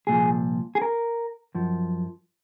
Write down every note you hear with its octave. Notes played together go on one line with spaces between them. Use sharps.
C2 A#2 F3 G#4
G#4
A#4
F#2 F3